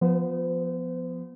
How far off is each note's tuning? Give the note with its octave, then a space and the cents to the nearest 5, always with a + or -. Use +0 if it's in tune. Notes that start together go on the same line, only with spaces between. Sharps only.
F3 +0 B3 +0 C5 -40